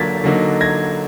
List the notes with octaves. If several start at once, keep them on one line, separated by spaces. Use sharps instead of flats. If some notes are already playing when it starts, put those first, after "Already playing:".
Already playing: D3 F#3 A#3 D4 F4 G#6 A6 B6
D3 F#3 A#3 D#4
G#6 A#6